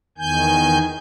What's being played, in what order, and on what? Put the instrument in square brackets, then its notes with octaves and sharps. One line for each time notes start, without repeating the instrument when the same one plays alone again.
[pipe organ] E2 D#3 G#5 G6